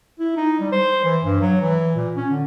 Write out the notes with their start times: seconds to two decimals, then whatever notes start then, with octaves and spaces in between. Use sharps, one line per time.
0.19 E4
0.37 D#4
0.60 G3
0.72 C5
1.05 E3
1.24 G2
1.41 F#3
1.61 E3
1.96 A#2
2.16 C#4
2.30 D3